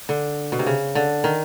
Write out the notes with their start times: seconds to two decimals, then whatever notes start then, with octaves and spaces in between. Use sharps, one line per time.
0.09 D3
0.52 B2
0.59 C3
0.67 C#3
0.95 D3
1.24 D#3